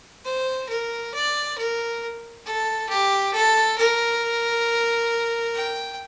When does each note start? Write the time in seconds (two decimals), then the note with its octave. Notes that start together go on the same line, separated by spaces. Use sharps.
0.25 C5
0.69 A#4
1.14 D5
1.58 A#4
2.46 A4
2.89 G4
3.33 A4
3.78 A#4
5.55 G5